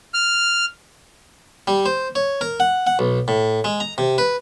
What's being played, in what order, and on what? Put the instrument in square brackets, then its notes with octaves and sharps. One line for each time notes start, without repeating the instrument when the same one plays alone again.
[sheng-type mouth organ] F6
[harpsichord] G3
C5
C#5
A#4
F#5
F#5
B1
A2
G#3
A#5
C3
B4